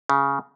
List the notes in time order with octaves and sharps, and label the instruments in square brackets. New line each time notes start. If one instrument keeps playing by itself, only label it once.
[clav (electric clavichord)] C#3